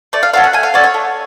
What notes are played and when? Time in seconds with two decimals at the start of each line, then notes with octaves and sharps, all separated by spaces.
0.13 A3 D5
0.23 F5
0.33 C#4 F#4 A4 F5
0.44 F#5
0.53 A3 G#5
0.63 F5
0.74 C#4 F#4 A4 D5
0.84 C#5
0.94 A3